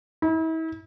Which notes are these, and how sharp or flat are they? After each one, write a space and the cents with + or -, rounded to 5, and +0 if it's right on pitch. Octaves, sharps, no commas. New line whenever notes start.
E4 -40